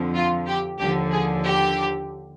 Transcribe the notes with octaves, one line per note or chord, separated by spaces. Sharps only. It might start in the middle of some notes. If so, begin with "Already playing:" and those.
Already playing: F2 D3 F3
F4
G4
D#2 D3 F3 G4
G#4
G4